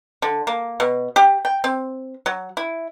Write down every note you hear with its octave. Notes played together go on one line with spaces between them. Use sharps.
D3
A#3
B2
G4
G5
C4
F#3
E4